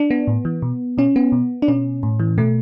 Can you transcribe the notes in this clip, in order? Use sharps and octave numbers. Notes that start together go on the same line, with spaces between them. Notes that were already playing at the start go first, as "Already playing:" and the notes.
Already playing: D4
B3
A2
E3
B2
B2 C#4
B3
B2
D4
B2 C#4
A2
E3
B2 A3